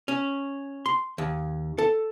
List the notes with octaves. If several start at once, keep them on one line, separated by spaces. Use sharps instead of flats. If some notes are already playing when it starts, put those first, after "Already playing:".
C#4
C6
D#2
A4